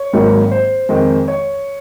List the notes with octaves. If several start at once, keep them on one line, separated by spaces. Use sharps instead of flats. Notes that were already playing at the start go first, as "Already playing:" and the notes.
Already playing: C#5
G#1 G#2 D#3 F#3 A#3
C5
F2 D#3 G#3
C#5